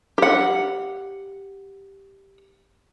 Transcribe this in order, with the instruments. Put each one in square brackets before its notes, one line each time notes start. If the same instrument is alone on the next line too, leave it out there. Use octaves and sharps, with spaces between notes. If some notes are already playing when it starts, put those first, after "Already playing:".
[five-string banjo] G4 F#5